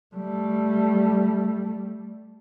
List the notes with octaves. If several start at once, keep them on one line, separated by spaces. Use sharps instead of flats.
G3 A3